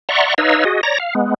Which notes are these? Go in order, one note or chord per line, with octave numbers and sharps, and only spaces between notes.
D5 E5 F#5 A#5 C6 C#6
D#4 B4 C#5 D#5 F5 E6
F#4 G#4 D#5
C#5 D5 A#5 A#6
F5
G#3 B3